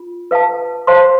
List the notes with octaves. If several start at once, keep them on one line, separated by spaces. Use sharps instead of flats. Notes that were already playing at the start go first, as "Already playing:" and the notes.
Already playing: F4
B4 F5 A5
C5 F5 A5 C6